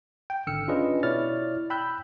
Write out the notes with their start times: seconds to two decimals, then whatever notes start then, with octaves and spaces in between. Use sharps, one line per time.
0.30 G5
0.47 G#1 D3 E6 F6 C#7
0.68 C#4 D4 F4 G#4 B4 D#5
1.03 B2 E4 C#5 D5 F6 A6
1.70 G5 B5 E6 F#6 G6